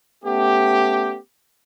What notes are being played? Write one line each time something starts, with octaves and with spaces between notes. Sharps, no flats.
A3 B3 C#4 G4